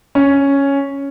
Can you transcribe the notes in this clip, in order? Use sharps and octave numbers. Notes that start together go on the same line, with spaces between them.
C#4